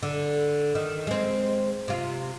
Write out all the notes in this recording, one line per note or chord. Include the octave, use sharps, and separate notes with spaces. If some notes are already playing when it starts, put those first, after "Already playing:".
D3
D#3
G#3 C4
C3 F4